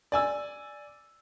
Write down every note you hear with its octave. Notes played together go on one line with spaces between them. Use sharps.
D5 G#5 E6